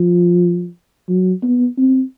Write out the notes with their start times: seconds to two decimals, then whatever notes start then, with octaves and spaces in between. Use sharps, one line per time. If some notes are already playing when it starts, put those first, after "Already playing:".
Already playing: F3
1.09 F#3
1.43 B3
1.78 C4